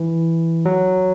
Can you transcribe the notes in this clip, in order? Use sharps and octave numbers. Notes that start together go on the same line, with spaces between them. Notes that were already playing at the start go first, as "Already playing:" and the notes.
Already playing: E3
F#3